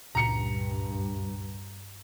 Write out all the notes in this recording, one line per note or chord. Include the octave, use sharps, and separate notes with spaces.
C#2 G2 A#2 C#3 A#5 C#7